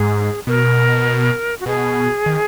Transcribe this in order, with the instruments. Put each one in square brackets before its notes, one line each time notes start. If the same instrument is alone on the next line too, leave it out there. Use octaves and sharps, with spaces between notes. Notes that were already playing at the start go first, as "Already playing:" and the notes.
Already playing: [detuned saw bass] G#2 [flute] G#4
[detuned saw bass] B2 [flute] A#4
[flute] F#4
[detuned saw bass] B2 [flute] G#4
[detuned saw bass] D#3